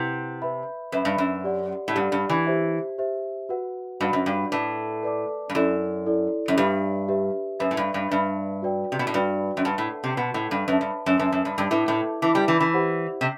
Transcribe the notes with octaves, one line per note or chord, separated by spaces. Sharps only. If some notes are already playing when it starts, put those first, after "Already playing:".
Already playing: C3 E4 B4 F#5
B4 E5 B5
F#2 B4 E5 B5
G2
F#2
G4 D5 F#5
A2
G2 G4 D5 F#5
G2
E3
G4 C5 E5
G4 C5 E5
F#4 B4 F#5
G2 F#4 B4 F#5
F#2
G2
A2 B4 D5 A5 D6
B4 D5 A5 D6
G2
F#2 E4 A4 D5
E4 A4 D5
F#2
G2 G4 B4 E5
G4 B4 E5
F#2 B4 E5 B5
A2
G2
G2
G2 B4 E5 B5
F#4 B4 D5 G5
C3
B2
A2
G2 F#4 B4 D5 G5
F#2
G2 B4 F#5 A5
A2
C3
B2 B4 F#5 A5
A2
G2
F#2 B4 E5 A5
G2
F#2
F#2 B4 E5 A5
F#2
G2
G2
A2 E4 B4 E5 A5 D6
A2
E3 E4 B4 E5 A5 D6
G3
E3
E3
G4 C5 F#5
C3